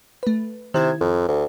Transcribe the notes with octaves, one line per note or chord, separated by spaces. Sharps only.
A3 B4
C3 D#3 E4 G#6
F2
D2